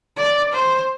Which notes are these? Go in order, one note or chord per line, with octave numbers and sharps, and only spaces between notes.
D5
C5